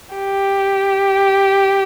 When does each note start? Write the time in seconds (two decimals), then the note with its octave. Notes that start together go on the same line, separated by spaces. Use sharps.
0.15 G4